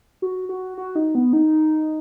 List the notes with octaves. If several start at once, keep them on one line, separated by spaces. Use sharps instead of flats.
F#4
F#4
F#4
D#4
B3
D#4